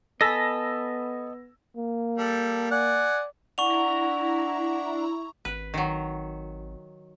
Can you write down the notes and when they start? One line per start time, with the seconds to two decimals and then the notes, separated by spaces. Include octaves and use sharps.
0.21 B3 A4 D#5 G#5 A5 B5 E6 A#6
1.77 A#3
2.18 G3 A4
2.71 D5 F#5 G#5
3.58 D4 E4 F#5 A#5 C#6 F7
5.45 G#1 B4
5.74 D#3 F#3